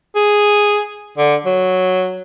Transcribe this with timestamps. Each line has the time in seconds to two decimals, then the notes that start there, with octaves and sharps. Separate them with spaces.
0.16 G#4
1.18 D3
1.46 F#3